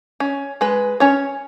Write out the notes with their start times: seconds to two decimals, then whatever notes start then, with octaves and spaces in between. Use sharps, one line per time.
0.20 C#4
0.61 G#3 B4
1.00 C#4 C#5